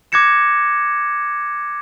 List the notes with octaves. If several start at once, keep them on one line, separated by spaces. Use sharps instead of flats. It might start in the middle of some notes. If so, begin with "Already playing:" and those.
D6 F#6 G#6 A#6 C#7 E7